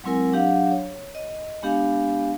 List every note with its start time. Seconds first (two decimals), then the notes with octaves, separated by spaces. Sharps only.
0.04 F#3 G#3 C4 E4 A#4 G#5
0.33 F#3 D4 G4 F5 F#5
0.72 C#5
1.15 D#5
1.62 G#3 B3 D4 G4 F5 G#5